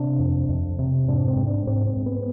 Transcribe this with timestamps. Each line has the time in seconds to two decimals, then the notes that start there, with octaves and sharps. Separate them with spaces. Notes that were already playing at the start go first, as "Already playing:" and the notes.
Already playing: C3 D4
0.19 F2
0.49 F2
0.79 C3
1.08 G#2 D4
1.28 C4
1.37 G#2
1.46 D4
1.67 G#2 C4
1.86 C4
1.97 G#2
2.06 B3